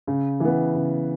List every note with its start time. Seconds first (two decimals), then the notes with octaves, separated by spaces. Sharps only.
0.07 C#3
0.40 E3 B3
0.75 C#3